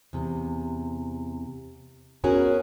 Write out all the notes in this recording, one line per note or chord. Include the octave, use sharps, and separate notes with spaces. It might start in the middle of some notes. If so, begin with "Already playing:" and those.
E2 C3
B3 C#4 F#4 G#4 A#4 C#5